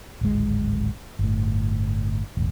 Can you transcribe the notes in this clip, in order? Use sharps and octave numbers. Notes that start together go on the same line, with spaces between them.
D1 G#1 G#3
G1 A2
E1 A1